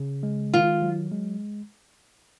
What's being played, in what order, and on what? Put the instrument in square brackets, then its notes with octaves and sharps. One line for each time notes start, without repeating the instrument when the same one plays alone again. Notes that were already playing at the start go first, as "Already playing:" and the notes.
Already playing: [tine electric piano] C#3
G#3
[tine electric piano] D#3 [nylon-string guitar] F4
[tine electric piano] F#3
G#3